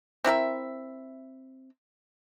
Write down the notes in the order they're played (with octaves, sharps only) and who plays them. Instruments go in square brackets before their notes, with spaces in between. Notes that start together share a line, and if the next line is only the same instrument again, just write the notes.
[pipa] C4 E4 A#4 E5